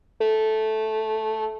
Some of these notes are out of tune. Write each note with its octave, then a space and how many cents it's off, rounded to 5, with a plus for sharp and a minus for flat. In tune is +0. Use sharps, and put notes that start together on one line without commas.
A3 -10